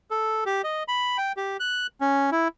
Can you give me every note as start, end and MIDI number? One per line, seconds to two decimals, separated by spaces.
0.11 0.44 69
0.46 0.62 67
0.64 0.83 75
0.88 1.17 83
1.18 1.32 79
1.37 1.57 67
1.60 1.87 90
2.01 2.30 61
2.32 2.48 64